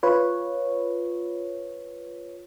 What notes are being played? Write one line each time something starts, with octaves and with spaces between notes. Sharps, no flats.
F4 B4 C#5